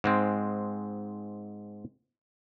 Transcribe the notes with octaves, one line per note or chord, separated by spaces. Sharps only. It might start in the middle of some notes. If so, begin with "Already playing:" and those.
G#2 G#3 C4